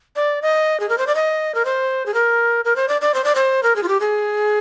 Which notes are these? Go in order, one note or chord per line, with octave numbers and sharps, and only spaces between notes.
D5
D#5
G#4
A#4
C5
D5
D#5
A#4
C5
G#4
A#4
A#4
C5
D5
D5
C5
D5
C5
A#4
G#4
F4
G4
G#4